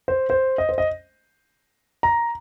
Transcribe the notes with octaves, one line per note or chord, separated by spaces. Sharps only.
C5
C5
D#5
C5
D#5
A#5